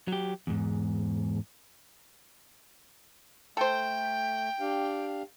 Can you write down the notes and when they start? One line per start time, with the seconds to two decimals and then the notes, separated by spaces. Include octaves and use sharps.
0.08 F#3 G4
0.47 E2 G#2
3.57 A3 A4 C5 G5
4.60 D4 G4 F5